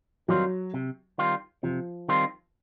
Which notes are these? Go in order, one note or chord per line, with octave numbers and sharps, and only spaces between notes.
D#3 F#3 G3 C4 F4
C3
D#3 G3 C4 F4
C3 F3
D#3 G3 C4 F4